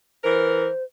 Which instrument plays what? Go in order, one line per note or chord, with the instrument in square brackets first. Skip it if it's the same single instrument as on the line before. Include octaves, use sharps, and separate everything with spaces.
[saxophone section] E3 A#4 [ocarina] C5